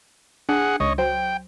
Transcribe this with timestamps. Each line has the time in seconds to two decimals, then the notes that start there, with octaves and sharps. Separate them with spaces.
0.49 D4 G#4 F#5
0.80 C#2 C#5 D#5
0.98 F#3 C5 G5